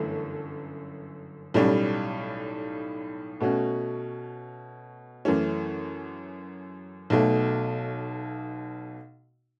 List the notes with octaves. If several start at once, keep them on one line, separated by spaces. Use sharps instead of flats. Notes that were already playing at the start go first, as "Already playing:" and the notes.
Already playing: G1 F#2 E3 A3 C#4
B1 A2 G3 C#4
B2 A3 C#4 F#4
F#2 E3 A3 C#4
B1 B2 A3